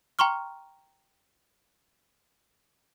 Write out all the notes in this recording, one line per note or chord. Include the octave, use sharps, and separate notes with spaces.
G5 A#5 C6 C#6 F6